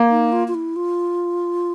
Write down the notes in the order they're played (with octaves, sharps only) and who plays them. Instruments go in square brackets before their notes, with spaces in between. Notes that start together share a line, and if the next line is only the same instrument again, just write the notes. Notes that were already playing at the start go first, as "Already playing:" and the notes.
Already playing: [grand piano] A#3
[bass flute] D#4
F4
F4
E4
F4